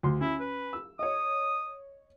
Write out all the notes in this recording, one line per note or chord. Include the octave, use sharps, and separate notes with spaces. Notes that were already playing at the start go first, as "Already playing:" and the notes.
D2 C6
C#4 E4
B4
E6
C#5 D#5 D#6